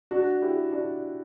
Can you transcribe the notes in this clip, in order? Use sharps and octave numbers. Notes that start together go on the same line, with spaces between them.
D4 F#4
E4 G4
D4 F#4